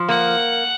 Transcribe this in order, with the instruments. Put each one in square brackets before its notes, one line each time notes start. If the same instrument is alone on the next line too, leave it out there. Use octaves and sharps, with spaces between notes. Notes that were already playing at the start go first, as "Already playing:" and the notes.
Already playing: [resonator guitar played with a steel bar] F3
[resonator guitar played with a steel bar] A#3 [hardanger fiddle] F#5